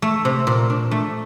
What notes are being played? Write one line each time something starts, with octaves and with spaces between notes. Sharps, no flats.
A3
C3
A#2
D4
A3